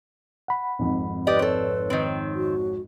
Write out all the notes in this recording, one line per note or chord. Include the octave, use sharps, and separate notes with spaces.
F#5 B5
G#1 F2 G#2
G4 B4 D5 D#5
C4 A4 C#5
D#3 C4
F#4